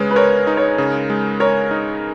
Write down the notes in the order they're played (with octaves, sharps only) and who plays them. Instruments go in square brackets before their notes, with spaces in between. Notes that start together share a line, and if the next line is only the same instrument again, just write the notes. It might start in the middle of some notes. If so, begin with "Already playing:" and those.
Already playing: [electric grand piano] C#3 G#3 [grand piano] B4 C#5
[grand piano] B4
[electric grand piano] A#4 [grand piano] C#5
[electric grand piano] D#4
[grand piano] C#5
[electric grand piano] C#3
G#3
[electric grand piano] A#4 [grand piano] C#5
[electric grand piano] D#4